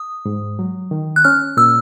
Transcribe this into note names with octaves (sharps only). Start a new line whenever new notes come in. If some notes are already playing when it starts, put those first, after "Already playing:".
Already playing: D#6
G#2
F#3
D#3
F#6
C#4 F6
A#2 E6